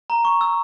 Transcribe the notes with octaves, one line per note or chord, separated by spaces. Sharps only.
A#5
C#6
E6